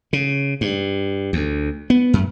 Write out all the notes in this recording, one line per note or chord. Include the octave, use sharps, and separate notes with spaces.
C#3
G2
D2
B3
F#2